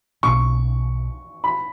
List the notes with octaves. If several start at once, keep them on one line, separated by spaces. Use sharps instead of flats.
B1 B2 A#3 C#4 C#6
B5